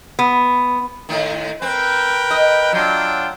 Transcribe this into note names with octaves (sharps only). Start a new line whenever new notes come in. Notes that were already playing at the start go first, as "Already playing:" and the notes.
B3
A2 D#3
C4 A#4 B4 G5
D#5
F#3 D4 F4 G5